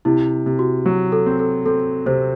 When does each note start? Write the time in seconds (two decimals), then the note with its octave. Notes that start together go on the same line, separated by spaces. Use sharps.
0.05 C3 E4
0.46 C3
0.59 F#4
0.86 F#3
1.12 A4
1.26 C4
1.39 A4
1.66 C4 A4
2.06 C3 C5